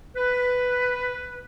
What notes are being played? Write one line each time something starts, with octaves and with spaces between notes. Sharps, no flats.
B4